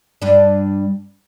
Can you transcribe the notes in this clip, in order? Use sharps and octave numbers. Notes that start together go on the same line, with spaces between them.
G2 D4